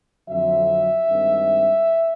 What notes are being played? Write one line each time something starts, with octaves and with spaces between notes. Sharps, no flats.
F2 D3 F#3 E5
G2 D#3 G#3 C4